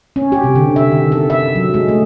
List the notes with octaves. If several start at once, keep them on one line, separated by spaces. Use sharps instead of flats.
C#4
G4
C3
D3
E5
D#3
A4
E5
F#3
G#3
A3